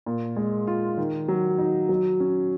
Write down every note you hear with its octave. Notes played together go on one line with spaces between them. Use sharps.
A#2
G#3
F4
D#3
F#3
D#4
F#3
C#4